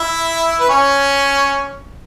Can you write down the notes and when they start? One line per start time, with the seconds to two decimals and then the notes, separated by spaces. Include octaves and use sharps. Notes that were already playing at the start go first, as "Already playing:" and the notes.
Already playing: E4 E5
0.60 B4
0.69 C#4 C#5